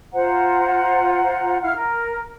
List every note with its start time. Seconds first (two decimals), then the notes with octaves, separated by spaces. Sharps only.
0.14 F4 C5 F#5 A#5
1.62 E4 F5 F#5 F6
1.75 A#4